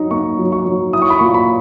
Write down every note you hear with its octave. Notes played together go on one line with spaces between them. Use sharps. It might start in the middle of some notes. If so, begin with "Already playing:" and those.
Already playing: F#3 D#4
A#3 C#6
F#3
C#6
F#3
E4 D#6
C#6
B5
A#2 C#6
B5